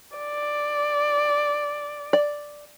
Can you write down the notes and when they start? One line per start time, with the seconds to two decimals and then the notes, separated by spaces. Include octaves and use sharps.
0.17 D5
2.13 D5